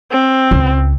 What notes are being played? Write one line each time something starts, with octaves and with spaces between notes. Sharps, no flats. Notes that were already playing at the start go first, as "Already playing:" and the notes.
C4
C#2